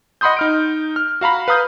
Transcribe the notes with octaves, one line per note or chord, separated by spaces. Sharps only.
D#5 F#5 B5 C6 D#6 G6
D#4 F6 D7
F6
F#4 F5 A#5 B5
B4 F5 A#5 D#6 F6 G6